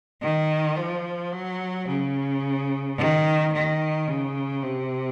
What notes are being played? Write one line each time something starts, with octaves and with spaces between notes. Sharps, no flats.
D#3
F3
F#3
C#3
D#3
D#3
C#3
C3